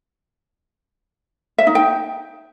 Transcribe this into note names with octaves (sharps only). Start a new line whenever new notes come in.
E5
D#4
G5